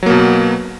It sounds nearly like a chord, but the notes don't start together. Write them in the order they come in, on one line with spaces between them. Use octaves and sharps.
F#3 A#3 B2 B3